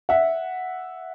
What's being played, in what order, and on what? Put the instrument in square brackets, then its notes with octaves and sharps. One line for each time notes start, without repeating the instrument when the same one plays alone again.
[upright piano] E5 F#5